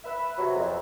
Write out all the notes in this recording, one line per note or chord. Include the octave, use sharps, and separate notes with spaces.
B4 E5
C3 F#3
F2